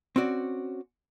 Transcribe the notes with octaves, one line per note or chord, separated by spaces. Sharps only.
C4 C#4 F#4 D5